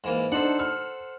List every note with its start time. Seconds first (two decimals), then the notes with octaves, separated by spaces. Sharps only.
0.04 G#2 E3 A#3
0.32 D4 D#4 A4 C5 F#5
0.59 F6